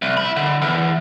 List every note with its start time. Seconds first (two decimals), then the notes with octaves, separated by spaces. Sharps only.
0.02 C2
0.17 E5 B5
0.36 D3
0.62 E2